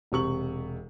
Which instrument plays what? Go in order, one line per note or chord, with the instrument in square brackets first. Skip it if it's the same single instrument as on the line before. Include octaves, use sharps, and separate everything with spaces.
[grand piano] E1 C3 C#6 F#7